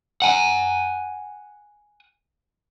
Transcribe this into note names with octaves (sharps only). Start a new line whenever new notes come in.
F#5 G#5